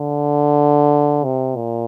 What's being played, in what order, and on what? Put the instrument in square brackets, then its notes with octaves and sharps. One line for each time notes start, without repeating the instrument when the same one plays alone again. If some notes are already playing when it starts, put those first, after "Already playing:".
Already playing: [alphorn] D3
C3
A#2